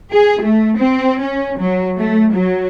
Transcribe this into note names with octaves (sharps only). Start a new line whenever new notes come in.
G#4
A3
C4
C#4
F#3
A3
F#3